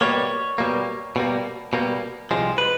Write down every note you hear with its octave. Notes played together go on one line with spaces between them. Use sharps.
B2 G3 A#3 C#5
B2 G3 A#3
B2 G3 A#3
B2 G3 A#3
C2 C3 F3 G#3
B4